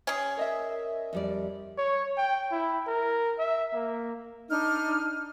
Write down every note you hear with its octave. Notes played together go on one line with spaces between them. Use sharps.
C#4 G#4
A#4 D#5 E5
F2 G3 D5
C#5
G5
E4
A#4
E5
A#3
D4 D#4 F6